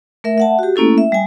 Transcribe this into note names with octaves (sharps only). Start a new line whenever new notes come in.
A3 A#4 E5
E5 F#5 A5
F#4 G4
A3 A#3 C#4 E4 A4
E5
G3 G#5